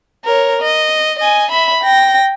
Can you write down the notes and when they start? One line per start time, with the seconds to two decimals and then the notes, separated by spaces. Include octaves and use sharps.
0.24 A#4 C#5
0.61 D#5
1.19 D#5 G#5
1.50 E5 B5
1.84 G5 A#6